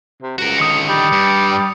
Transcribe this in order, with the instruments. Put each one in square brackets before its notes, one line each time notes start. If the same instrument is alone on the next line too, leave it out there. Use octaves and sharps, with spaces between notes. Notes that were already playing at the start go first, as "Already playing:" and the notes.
[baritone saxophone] C3
[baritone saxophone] C#2 [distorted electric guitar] F#4 A#4
[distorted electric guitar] D3 D#3 [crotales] D#6 C#7
[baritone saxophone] G3
[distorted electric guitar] G2